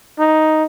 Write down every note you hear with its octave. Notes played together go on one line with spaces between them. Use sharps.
D#4